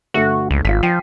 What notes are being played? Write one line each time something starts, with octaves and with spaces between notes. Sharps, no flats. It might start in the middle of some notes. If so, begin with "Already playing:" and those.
G1 A3 F#4 E5
C#2
G#1 F4 B6
F3 G5 C7 D#7